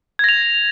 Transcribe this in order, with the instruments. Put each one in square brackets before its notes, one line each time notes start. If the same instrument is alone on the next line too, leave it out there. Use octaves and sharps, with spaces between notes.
[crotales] G#6
A#6
F7